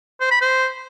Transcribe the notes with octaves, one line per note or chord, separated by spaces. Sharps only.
C5
B5
C5